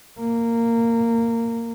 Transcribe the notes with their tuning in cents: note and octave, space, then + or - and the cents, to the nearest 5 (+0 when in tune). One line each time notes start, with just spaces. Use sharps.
A#3 -15